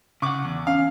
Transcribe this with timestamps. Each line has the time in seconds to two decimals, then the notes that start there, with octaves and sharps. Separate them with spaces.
0.22 C#3 F#5 C#6 D6
0.45 E2
0.67 C#4 F5